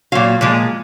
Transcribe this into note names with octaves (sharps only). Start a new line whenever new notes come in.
A#2 F#3 F5
A#2 F3 G#3